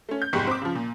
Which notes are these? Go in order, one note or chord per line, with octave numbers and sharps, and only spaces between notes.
A3 C#4
G6
F1 B1 G#2 G4 C#6 B6
C4 D6
C#3 F3
A#2